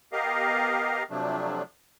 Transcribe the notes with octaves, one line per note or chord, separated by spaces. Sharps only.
B3 G4 A#4 D#5 F5
C3 F3 F#3 A3 D4